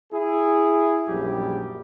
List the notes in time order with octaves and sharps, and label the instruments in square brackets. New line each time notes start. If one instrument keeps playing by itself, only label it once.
[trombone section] E4 G#4
A#1 F#2 G3 G4